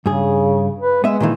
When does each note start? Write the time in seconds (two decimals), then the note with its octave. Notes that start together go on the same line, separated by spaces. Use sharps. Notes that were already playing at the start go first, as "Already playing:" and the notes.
0.06 G2 C#3 G#4
0.79 B4
1.04 G#3 B3 E5
1.20 A#2 D#3 E3